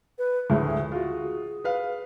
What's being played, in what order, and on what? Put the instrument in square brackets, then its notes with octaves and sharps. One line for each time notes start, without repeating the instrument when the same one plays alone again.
[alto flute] B4
[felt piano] D2 A2 [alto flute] G#4
[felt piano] F4 F#4 [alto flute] G#4
[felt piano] B4 F5